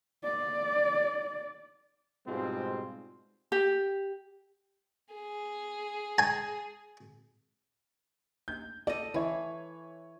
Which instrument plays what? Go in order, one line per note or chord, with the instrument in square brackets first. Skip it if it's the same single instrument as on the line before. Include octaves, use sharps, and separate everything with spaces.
[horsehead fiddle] D5
[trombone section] G#2 B2 G3 G#3 C4 F4
[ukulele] G4
[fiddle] G#4
[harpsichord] G#5 A5
[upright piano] G6
[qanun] A4 D#5 [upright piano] D5
[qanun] E3 [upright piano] B4 C#5